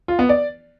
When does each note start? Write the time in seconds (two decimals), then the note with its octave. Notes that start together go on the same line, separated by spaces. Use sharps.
0.08 F4
0.19 B3
0.29 D5